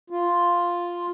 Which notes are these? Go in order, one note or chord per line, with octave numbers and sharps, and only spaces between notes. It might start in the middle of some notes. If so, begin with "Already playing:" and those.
F4